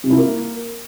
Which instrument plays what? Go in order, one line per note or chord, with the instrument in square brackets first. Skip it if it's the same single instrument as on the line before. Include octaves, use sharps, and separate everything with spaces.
[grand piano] C3
E4
A#3